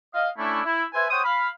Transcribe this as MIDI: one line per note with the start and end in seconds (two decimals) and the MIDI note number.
0.14 0.29 75
0.14 0.29 77
0.38 0.61 57
0.38 0.61 61
0.38 0.61 62
0.38 0.61 64
0.65 0.84 64
0.94 1.05 71
0.94 1.05 72
0.94 1.05 76
0.94 1.05 80
1.10 1.22 72
1.10 1.22 73
1.10 1.22 78
1.10 1.22 79
1.10 1.22 87
1.25 1.49 77
1.25 1.49 83